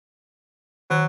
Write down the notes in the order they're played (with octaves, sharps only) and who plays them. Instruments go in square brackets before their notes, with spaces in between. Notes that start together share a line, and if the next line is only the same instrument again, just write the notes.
[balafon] D#3 [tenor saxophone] F#3